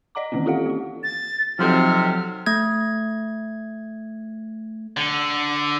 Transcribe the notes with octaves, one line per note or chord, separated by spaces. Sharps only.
D5 D#5 F#5 A#5 D6
D#3 E3 A#3 C4 C#4
F4 G4 A4 F5 F#5
A#3 F4
A6
C3 F3 F#3 C4 D#4 A4 F6
A3 G#6
D3